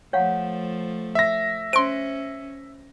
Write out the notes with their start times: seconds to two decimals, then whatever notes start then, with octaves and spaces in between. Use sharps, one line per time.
0.13 F3 A3 C#5 F5 F#5
1.15 E5 A#6
1.73 C#4 C5 C6 D7